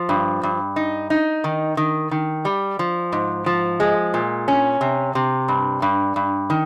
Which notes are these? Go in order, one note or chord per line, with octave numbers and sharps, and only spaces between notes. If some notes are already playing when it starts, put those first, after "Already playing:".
Already playing: F3
G2
G2
D#4
D#4
D#3
D#3
D#3
G3
F3
G#2
F3
G#3
A#2
C#4
C3
C3
G2
G2
G2
D#3